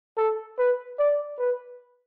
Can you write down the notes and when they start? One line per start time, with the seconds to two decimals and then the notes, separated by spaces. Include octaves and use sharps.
0.17 A4
0.59 B4
0.99 D5
1.39 B4